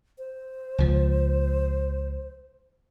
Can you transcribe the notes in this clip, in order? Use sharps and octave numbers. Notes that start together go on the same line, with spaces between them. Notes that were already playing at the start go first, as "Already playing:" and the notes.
C5
C#2 F3